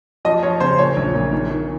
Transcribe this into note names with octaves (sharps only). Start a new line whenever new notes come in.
F3 D#5
F3 C#5
C#3 C5
A#2 C#5
A#1
A#2
D#3
D#3